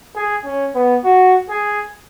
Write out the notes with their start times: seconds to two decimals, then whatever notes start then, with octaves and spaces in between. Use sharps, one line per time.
0.16 G#4
0.45 C#4
0.75 B3
1.04 F#4
1.49 G#4